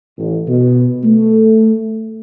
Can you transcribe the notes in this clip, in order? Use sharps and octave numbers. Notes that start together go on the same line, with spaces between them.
A1
B2
A3